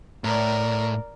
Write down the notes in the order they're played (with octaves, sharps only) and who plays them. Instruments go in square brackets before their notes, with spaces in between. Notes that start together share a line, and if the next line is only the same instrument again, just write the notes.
[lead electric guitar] A2 [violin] A#4 D5